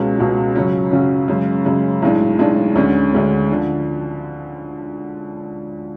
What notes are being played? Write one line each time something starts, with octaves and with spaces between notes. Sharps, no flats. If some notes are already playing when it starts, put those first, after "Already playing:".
Already playing: C#2 B2 G#3 C#4
C#2 B2 G#3 C#4
F#2 C#3 F#3 C#4
F#2 C#3 F#3 C#4
F#2 C#3 G#3
F#2 C#3 G#3
B1 A2 G#3 D4
B1 A2 G#3 D4
D2 D3 G#3 C#4
D2 D3 G#3 C#4
D3 F3